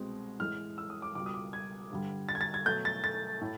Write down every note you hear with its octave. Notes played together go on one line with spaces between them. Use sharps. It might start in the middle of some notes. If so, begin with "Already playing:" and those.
Already playing: C2 B2 G#3 C4
A2 E3 G#3 F6
E6
D#6
D6
C#2 B2 G3 D6
D#6
D6
G#6
G2 D3 G3
A6
G#6
A6
G#6
B2 F#3 A3 G6
A6
A6
A2